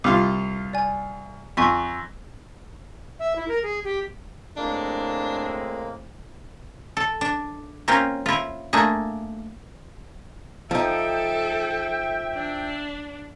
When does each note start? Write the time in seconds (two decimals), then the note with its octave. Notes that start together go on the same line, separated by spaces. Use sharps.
0.04 C2 F4 D6
0.73 D5 G#5
1.57 F2 G#5 C#6 B6
3.19 E5
3.36 E4
3.48 A#4
3.63 G#4
3.84 G4
4.57 A2 G#3 A#3 C4 D4
6.97 A4
7.21 D4
7.88 A#3 C4 C#4 F4
8.26 E4 F4
8.73 A3 A#3 D4 G#4
10.71 F3 D#4 A4 E5 G5
12.35 D4